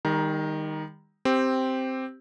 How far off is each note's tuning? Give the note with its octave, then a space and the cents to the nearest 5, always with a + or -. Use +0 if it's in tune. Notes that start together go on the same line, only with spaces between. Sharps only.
D#3 +0 G3 +40 A#5 +15
C4 +0 G4 -5